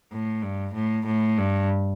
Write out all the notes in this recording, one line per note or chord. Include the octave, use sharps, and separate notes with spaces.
A2
G2
A2
A2
G2